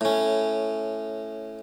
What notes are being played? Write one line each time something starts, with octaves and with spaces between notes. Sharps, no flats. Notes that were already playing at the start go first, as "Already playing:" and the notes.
A2 C#4